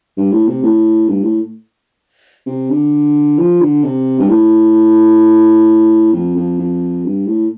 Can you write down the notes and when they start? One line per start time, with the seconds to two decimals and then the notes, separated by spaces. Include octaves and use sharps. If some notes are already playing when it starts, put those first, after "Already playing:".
0.17 G2
0.32 A2
0.48 C3
0.63 A2
1.09 G2
1.24 A2
2.46 C3
2.70 D3
3.38 F3
3.61 D3
3.84 C3
4.20 G2
4.30 A2
6.13 F2
6.36 F2
6.59 F2
7.05 G2
7.28 A2